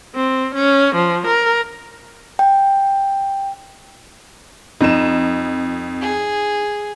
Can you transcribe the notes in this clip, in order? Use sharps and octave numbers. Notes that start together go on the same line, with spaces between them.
C4
C#4
F3
A#4
G5
F2 D#4 E7
G#4